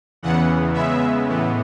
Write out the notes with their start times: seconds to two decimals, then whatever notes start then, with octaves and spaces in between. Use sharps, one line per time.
0.23 E2 C#3 E3 B3 F#5
0.74 C#3 G#3 B3 E5
1.26 A2 E3 B3